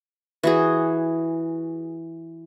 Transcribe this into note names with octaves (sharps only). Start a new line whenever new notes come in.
E3 F#4 G#4